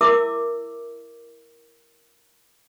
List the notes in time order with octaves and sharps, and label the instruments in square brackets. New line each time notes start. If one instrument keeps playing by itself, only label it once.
[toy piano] E4 A#4 E5 D6 E6